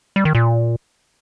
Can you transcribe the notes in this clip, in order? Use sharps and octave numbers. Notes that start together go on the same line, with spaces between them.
G3
D#3
A#2